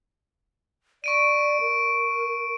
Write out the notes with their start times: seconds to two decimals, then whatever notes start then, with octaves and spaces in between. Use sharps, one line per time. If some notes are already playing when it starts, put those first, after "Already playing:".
1.04 D5 C#6 D7 D#7
1.60 A#4